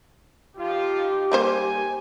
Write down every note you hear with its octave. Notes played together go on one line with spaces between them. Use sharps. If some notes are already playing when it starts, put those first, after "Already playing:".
F3 D#4 F4 G4
G3 A#3 C5 G#5